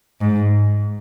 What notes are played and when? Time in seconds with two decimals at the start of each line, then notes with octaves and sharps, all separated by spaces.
0.21 G#2